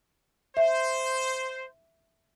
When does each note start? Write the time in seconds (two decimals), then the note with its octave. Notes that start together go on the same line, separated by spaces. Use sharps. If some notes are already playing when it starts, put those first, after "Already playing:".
0.57 C5 E5